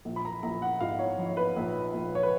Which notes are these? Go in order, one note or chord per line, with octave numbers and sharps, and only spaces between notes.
A#1
B5
A#5
A#1 A#5
F#5
G#2 F5
C#5
F3
C#5
B4
A#1
A#1
C#5
B4